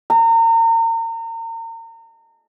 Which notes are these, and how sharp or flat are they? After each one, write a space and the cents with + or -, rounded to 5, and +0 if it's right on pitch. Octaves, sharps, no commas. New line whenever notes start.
A#5 -35